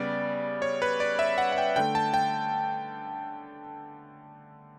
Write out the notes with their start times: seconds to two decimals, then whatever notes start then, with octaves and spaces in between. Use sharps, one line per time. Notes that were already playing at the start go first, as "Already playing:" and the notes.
Already playing: C#3 G3 B3 D5
0.62 C#5
0.82 B4
1.00 D5
1.19 E5
1.38 F#5
1.52 F#5
1.58 G5
1.76 D3 A3 G5
1.95 A5
2.14 G5